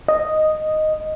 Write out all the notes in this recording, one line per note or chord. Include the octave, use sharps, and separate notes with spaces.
D#5